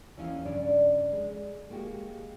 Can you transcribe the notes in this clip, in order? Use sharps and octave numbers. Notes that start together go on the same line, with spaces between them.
D#2 E3 C#4 E4 D#5 F5
G2 C#3 D4 C#5 D5
G#3
G#3 A#3 F#4 G4